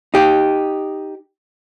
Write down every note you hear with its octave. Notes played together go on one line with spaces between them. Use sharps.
D#4 G4